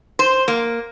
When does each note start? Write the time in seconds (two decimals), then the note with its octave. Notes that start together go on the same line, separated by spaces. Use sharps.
0.19 C5
0.48 A#3